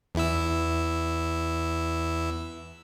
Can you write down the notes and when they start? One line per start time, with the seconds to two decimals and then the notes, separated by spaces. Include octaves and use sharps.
0.15 E2 E4 E6